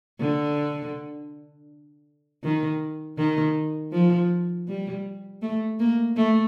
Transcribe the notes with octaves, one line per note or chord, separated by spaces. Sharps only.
D3
D#3
D#3
F3
G3
A3
A#3
A3